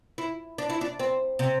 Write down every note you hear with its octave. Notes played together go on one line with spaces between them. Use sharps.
E4
D4
E4
D4
C4
C3